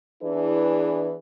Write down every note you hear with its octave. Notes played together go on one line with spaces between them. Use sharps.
E2 E3 D4 E4 G#4 B4